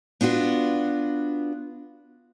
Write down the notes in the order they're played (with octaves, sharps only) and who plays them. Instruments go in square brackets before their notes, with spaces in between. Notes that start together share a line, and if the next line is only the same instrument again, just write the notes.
[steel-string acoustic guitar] B3 D4 F4 F#4 B4